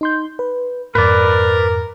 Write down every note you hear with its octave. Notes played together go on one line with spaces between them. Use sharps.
D#4 C6 G6
B4
F2 G#2 A#4 B4 D5